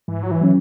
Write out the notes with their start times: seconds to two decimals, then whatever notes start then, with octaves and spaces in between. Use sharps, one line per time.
0.08 G#2 E3
0.23 F#3
0.31 E3
0.41 F#3 C#4